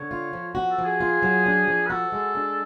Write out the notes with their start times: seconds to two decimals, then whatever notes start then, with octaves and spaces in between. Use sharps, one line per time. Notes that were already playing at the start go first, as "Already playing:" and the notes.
Already playing: D3 C#5
0.11 F4
0.33 F3
0.55 F#4
0.70 A4
0.78 F3
0.85 G#4
1.00 F4
1.23 F#3
1.46 D4
1.68 F3
1.86 B4
1.90 F#4 A4
2.12 G#3
2.35 D4